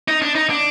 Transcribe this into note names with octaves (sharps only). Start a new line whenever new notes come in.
D#4
D4
D#4
D4